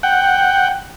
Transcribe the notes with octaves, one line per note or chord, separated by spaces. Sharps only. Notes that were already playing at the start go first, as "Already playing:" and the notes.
F#5 G5